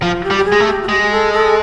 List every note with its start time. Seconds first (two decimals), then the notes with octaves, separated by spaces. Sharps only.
0.02 F3 F4
0.24 G4
0.31 G3
0.37 G4
0.45 G#4
0.52 G#3
0.60 A3
0.67 G4
0.82 F#4
0.89 G#3 G4
1.02 G#4
1.11 A4
1.33 A4